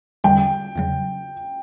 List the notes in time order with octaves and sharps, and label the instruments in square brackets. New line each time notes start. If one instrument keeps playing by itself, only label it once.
[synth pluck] E2 D3 G3 [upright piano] G5
[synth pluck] E2 C#3 F#3